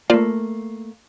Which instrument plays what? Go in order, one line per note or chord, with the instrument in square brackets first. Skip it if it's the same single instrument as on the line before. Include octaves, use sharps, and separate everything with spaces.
[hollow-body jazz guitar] A3 A#3 [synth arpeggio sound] F4 C5 D5